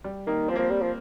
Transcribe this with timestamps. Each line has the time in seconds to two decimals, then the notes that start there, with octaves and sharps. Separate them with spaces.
0.04 G3
0.27 D#3 A#3
0.48 F3 C4
0.56 A#3
0.59 F3
0.64 C4
0.70 G3
0.81 F3